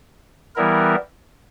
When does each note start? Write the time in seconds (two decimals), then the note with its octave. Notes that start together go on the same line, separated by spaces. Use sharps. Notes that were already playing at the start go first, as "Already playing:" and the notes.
0.56 E3 G3 B3 E4 A#4